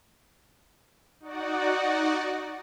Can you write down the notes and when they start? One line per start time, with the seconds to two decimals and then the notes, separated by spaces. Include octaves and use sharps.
1.20 D#4 F#4 D5 F#5